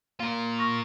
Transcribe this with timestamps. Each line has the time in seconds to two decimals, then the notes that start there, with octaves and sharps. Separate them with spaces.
0.20 A#3 F4 A#4
0.59 C#6 F6 A#6